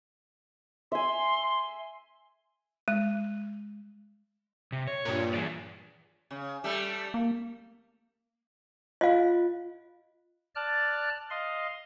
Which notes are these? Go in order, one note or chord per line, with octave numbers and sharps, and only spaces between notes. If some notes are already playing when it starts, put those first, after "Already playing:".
E5 G#5 C6
G#3
C3
C#5
G2 A#2
E3 G#4 D5
C#3
G3 A3 A4
A#3
F4 D#5 F5
D5 A5 F6 F#6
D#5 F5 C6